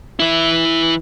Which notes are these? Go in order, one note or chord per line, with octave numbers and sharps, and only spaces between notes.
E3 E4